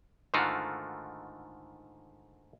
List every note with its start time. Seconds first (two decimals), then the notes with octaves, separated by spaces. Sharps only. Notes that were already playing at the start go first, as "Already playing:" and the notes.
0.34 G#2 D3 D#3 A3 F4 F#4